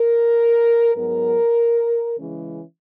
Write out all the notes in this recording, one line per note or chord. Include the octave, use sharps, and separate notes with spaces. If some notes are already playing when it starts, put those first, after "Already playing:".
Already playing: A#4
G#2 F#3 B3 A#4
C#3 E3 G#3 C#4